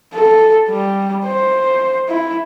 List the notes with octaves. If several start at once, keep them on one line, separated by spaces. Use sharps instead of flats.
A4
G3
C5
E4